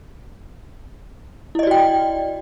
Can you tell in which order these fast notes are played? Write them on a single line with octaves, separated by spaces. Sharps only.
E4 D#5 D5 F#4 G5